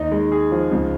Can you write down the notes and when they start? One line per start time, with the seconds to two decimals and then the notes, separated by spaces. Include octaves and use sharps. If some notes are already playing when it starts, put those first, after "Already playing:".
Already playing: D#2 D#4
0.12 G#3
0.32 G#4
0.52 F3
0.71 C#2